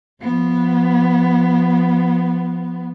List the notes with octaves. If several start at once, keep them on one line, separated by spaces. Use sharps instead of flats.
F3 B3